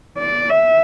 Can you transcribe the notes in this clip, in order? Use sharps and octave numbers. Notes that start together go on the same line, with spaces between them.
D5
E5